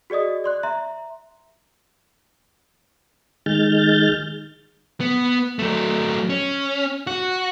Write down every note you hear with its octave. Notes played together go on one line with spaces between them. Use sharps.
F#4 G#4 D5 D#5 D#6
D5 C6 F#6
E5 A#5 C6
D#3 G#3 F6 G6 A6
B3
F#3 A3
C#4
F#4